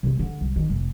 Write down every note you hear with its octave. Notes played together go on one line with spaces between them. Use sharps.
C3 G#3
D3 G#3
C2
D#3
F1